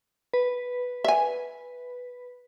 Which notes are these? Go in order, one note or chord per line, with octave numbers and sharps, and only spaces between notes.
B4
E5 G#5